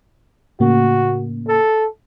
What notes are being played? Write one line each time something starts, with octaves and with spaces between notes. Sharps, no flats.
A2 C#3 A#3 F#4
A4